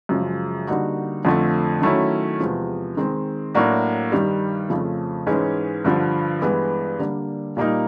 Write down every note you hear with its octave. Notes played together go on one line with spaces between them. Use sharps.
F#2 C#3 F3 G#3
D3 G3 A#3 D#4 F#4
F2 D3 F3 A3
D#3 F#3 A3 C#4 E4
E2 C3 F3 G#3
D#3 G#3 C4
A2 F#3 A#3 D4 F#4
G2 D#3 G3
F2 C#3 F3 A3
G#2 E3 G#3 C#4
G2 D3 F3
G2 E3 G#3 B3
D3 G3 A#3 D4
A#2 G3 A#3 D#4